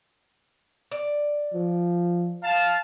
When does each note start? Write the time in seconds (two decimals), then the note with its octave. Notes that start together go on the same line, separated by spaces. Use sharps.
0.91 D5
1.54 F3
2.44 F5 A5